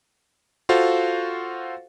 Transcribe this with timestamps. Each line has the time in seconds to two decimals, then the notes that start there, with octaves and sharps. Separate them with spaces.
0.69 F4 F#4 A4 C5 F5